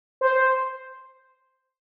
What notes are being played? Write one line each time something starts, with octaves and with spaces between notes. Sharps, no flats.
C5